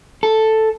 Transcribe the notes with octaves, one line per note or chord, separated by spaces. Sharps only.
A4